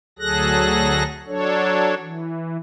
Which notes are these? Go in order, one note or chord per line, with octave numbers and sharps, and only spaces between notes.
D2 F#3 G#4 A4 F#6 A#6
F#3 D4 A4 C#5
E3